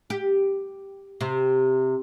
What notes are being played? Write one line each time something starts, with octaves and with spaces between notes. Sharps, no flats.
G4
C3